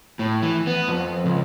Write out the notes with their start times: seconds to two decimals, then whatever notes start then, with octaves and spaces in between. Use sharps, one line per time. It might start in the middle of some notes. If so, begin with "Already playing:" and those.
0.19 A2
0.43 E3
0.67 B3
0.88 F2
1.26 C#2